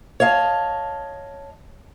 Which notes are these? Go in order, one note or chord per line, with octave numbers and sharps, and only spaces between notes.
C#5 D#5 F5 A5